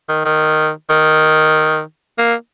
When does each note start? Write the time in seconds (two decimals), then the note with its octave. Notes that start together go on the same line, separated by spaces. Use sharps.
0.09 D#3
0.25 D#3
0.90 D#3
2.18 A#3